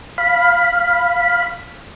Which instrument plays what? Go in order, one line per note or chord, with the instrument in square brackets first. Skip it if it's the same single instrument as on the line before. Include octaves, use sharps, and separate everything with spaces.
[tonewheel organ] F5 B5